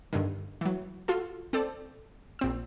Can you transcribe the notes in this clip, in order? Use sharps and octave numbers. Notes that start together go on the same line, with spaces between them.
G2 D3 D#3
E3 F#3
F4 F#4 A4
C4 A4 D5
A#1 C4 E6